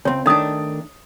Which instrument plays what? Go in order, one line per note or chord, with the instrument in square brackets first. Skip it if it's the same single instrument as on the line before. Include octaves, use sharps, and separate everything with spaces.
[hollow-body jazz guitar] C#2 C4 [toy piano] C#5
[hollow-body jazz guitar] D#3 A3 D4 [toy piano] D#5 D#6